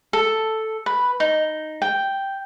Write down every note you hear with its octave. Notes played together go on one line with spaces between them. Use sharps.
A4
B4
D#4
G5